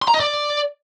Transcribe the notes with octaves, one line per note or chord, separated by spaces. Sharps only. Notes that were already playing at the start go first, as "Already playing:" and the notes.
C6
A#5
D#5
D5